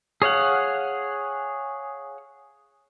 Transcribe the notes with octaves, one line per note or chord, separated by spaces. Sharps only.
G#4 C#5 F5 F#5